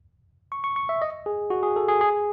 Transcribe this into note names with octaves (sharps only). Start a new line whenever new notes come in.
C#6
C#6
C#6
E5
D#5
G#4
F#4
G#4
A4
G#4
G#4